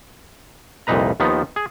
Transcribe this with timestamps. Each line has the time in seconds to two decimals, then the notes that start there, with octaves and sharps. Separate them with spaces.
0.87 C2 F2 A#2 D#4 B4 A#5
1.20 D#2 D#3 F3 B3 D#4
1.56 G#4